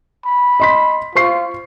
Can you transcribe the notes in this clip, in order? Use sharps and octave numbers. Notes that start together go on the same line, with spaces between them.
B5
D#5 C6 B6
F4 C5 C#6 C7